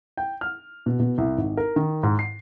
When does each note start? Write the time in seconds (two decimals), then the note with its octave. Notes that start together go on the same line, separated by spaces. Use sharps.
0.17 G5
0.41 F6
0.86 B2
1.00 B2
1.18 C2
1.38 G#1
1.57 A#4
1.76 D#3
2.03 G#2
2.19 C7